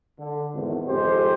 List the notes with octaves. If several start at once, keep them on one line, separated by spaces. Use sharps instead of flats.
D3
G#1 E2
G#1 F2 G#3 G4 C5